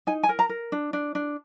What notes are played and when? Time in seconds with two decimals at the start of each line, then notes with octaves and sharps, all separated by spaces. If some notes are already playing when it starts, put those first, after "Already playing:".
0.07 D#4 G#5
0.23 G#5
0.29 A#4
0.39 A#5
0.49 A#4
0.72 D4
0.93 D4
1.15 D4